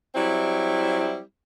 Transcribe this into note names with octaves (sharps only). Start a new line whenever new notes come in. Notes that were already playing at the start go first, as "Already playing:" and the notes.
F#3 G3 C4 E4